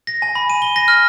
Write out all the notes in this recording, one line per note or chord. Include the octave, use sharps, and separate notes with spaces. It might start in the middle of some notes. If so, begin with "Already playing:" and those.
A#6
G#5
B5
D#7
G7
A#6
F6